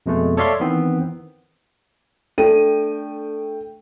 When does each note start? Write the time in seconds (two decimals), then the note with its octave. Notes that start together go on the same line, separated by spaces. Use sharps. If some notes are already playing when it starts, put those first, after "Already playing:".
0.06 F2 B2 G#3 A3
0.37 A4 C#5 D5 E5 F5 C6
0.60 D#3 E3 B3 C4
2.38 A3 D4 A4 G5 D#7